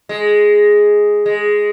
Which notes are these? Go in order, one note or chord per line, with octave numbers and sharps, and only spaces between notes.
G#3
G#3